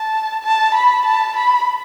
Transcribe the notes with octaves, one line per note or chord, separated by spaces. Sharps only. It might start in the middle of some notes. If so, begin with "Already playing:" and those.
Already playing: A5
A5
B5
A5
B5